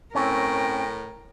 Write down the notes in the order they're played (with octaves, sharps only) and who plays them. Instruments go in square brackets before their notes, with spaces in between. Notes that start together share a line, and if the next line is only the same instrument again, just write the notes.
[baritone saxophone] A2 [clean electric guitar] C4 C#4 [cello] A#4 [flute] G5